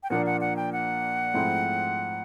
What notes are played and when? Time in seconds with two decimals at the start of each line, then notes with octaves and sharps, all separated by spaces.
0.03 G5
0.10 A#2 F3 A#3 D4 F#5
0.26 F#5
0.41 F#5
0.56 G5
0.73 F#5
1.34 G#2 F3 A3 C4 E4